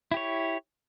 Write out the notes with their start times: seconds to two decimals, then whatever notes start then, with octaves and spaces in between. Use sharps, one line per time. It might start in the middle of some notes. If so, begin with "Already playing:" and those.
0.11 E4
0.14 G4
0.17 C#5